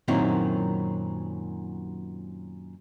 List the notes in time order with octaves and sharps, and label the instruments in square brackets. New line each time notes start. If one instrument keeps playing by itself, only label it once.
[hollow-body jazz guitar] F#2 A#2 D#3 F#3 C4 E4